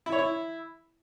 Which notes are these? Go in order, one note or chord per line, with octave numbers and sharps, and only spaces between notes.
E4
C#5
E4